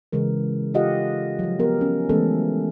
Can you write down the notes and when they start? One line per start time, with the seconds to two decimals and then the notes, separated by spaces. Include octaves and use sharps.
0.12 C#3 E3 G#3 A#4
0.74 F4 G4 A4 D#5 F5 F#5
1.39 F3 F#3
1.59 B3 G4 A#4
1.81 C#4
2.09 E3 G#3 A3 B3 C#4 A4